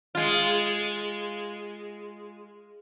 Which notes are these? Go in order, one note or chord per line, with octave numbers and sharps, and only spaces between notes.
G#3 F4